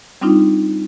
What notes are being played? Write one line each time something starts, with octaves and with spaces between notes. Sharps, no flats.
G3 C4 D4 D#4 F4